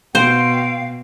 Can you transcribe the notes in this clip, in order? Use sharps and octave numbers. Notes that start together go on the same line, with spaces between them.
B2 C5 F5 G5